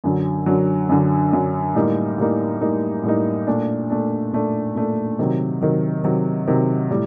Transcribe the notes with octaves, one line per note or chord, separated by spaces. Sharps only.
F#2 D3 F#3
F#2 D3 F#3
F#2 D3 F#3
F#2 D3 F#3
A2 G3 A#3 D#4
A2 G3 A#3 D#4
A2 G3 A#3 D#4
A2 G3 A#3 D#4
A#2 A3 D4
A#2 A3 D4
A#2 A3 D4
A#2 A3 D4
C3 D#3 F#3
C3 D#3 F#3
C3 D#3 F#3
C3 D#3 F#3
A2 G3